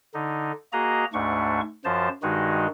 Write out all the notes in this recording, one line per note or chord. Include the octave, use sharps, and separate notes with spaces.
D3 D#4
A#3 F#4 G#4 D#5 A#5
D2 G#2 A3 D4 C#6
F#2 F3 C5 A5
G2 D#3 G#3 D#4 F#4